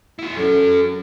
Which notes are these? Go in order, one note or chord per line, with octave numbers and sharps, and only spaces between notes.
E4 F#4
F#3 C#4 A4